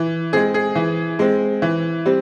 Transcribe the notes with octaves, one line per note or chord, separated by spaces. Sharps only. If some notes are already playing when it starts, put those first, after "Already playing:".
Already playing: E3
G#3 C4 G#4
G#4
E3
G#3 C4
E3
G3 C4